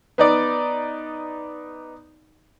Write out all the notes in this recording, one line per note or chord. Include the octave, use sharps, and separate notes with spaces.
B3 D#4 D5